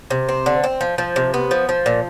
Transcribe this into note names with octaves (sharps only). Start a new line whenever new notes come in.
C3
C4
D3
C4
F3
F3
C3
B3
F3
F3
A#2